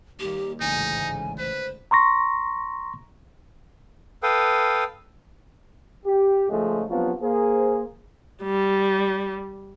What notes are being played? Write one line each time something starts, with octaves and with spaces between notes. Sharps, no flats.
D#2 G3 A#3 G4
A1 D2 G#2 C#3 D#4 G#5
B4 C5
A#5 C6 C#6 A#6
A4 B4 F5 G5 D#6
G4
G#2 C#3 F3 G#3 A3
G2 F3 F#3 B3 C4 F4
A#3 G#4 C5
G3